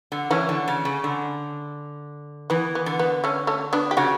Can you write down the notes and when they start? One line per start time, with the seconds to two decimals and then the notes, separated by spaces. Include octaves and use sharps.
0.12 D3
0.31 E3 A3 C#4
0.49 D3
0.68 C#3
0.85 C#3
1.04 D3
2.50 E3 B3
2.75 B3
2.86 D3
2.99 B3
3.24 A3 C#4
3.47 A3 C#4
3.73 B3 D4
3.91 G4
3.97 C#3 D4 F#4